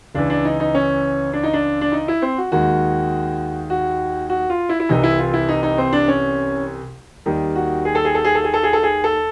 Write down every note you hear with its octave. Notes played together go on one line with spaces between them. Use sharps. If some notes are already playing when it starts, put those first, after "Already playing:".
C#2 C#3 E3 D4
D4
D#4
D#4
C#4
D4
D#4
D4
D4
D#4
E4
C4
F#4
D#2 D#3 G#3 F#4
F#4
F#4
F4
E4
E4
C2 C3 E3 D#4
E4
F4
E4
D#4
D#4
C4
D4
C#4
D#2 D#3 G3
F#4
G#4
A4
G#4
A4
G#4
A4
G#4
A4
G#4
A4
G#4
A4